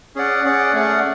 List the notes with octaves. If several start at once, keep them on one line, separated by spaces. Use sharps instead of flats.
C#4 G#4 D5 F#5
C#4 G#4 D5 F#5
A3 C#4 G#4 D5 F#5